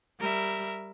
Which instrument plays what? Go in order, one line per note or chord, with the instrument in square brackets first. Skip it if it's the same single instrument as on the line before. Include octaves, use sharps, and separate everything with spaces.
[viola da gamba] G3 [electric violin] A#4 E5